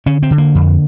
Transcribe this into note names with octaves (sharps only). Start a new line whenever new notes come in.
D3 C#4
C4
D3
A#3
F2